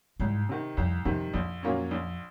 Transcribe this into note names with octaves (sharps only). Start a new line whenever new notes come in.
C2 G#2
C3 D#3
C2 F2
F2 C3 D#3
A#1 F2
A#2 F#3 A#3 C#4
A#1